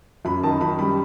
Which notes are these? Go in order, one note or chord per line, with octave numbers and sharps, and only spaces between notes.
F#2 B5
D#3 A5
F#2 B5
G3 B5